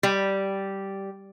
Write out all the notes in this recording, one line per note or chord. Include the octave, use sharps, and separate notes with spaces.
G3